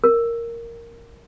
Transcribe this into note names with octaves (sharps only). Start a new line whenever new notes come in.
A#4